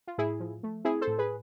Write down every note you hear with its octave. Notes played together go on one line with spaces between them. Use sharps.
F4
A2 E4 G#4
F3
A3
C4 E4 G#4
A4 C5
A2
G#4 B4